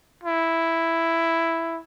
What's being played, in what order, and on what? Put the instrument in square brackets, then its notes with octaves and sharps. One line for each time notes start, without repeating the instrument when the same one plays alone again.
[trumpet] E4